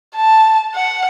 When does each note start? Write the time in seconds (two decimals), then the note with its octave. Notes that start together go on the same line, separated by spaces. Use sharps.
0.16 A5
0.75 F#5